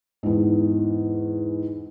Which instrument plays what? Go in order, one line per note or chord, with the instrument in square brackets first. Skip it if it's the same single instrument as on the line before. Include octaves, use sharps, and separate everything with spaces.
[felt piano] E2 G#2